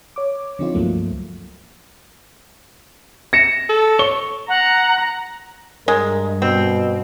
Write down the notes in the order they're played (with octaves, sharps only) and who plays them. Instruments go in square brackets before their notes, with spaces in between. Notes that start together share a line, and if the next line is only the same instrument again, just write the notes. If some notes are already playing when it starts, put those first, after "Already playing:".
[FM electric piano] C#5 D6
D3 F3 C4 D#4 F4
C#2 G2 F3 F#3 A3 A#3
[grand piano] A#6 C#7 E7
[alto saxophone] A4
[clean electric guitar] C#5 [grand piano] G7
[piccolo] F#5 [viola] A#5
[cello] G2 [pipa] G#3 [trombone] A#4
[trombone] B2 [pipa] C4